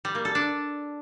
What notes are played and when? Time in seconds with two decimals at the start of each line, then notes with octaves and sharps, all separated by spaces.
0.05 G3
0.15 A#3
0.25 A4
0.35 D4